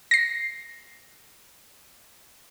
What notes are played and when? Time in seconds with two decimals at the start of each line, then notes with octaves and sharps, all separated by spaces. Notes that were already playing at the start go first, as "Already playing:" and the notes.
0.11 A#6 C7